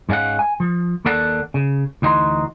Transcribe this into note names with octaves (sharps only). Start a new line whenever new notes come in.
G#2 G#3 C#4 F5 F#5
G#5
F3
D#2 D#3 A#3 A4 D5 F#5
C#3
D2 E3 D#4 F#4 C6